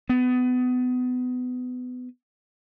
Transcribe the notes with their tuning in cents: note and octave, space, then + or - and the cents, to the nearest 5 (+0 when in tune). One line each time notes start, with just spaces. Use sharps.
B3 +25